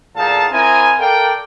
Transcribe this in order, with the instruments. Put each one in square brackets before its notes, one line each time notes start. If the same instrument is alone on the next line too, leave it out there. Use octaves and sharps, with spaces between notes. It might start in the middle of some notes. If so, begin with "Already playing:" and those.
[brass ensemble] E2 A#2 D#4 A4 F5 A5
C4 E4 A#4 D#5 G#5
A4 A#4 D5 F5 G5